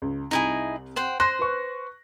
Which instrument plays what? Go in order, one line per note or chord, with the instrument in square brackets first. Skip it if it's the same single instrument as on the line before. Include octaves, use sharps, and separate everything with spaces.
[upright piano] C#2
[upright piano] C2 [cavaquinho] D#4 E4 G#4
[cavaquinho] C5 F#5 G5
[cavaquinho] C5 [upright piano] C6 F#6 A#6
[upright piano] B4 C#6